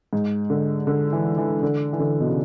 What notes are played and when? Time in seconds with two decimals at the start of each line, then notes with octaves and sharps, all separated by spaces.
0.13 G#2
0.50 D3
0.87 D3
1.13 E3
1.38 E3
1.63 D3
1.93 E3
2.00 D3
2.20 B2
2.28 C#3